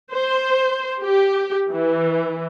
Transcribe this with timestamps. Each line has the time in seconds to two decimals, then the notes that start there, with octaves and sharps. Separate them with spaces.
0.12 C5
1.02 G4
1.70 E3